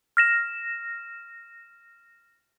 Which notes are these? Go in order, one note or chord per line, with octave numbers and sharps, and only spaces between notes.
F6 A#6 E7